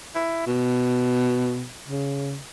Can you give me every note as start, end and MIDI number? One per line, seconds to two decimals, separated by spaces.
0.15 0.41 64
0.46 1.69 47
1.88 2.38 49